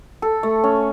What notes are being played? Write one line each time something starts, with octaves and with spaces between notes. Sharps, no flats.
A4
A3
C#4